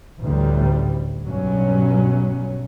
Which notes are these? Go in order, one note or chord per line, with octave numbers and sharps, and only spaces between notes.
A1 D2 G3
B1 G2 F#3 C#4